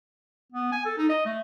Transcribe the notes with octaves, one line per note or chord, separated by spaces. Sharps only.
B3
G#5
A4
D#4
D#5
A3